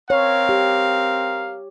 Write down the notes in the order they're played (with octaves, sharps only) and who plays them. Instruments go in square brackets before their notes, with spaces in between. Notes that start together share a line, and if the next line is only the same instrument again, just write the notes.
[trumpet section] C4 A#4 F5 [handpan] C#5
[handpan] G4